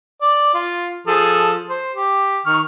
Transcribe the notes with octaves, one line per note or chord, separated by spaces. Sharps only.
D5
F4
F3 G#4 A4
C5
G4
D#3 C#6 F6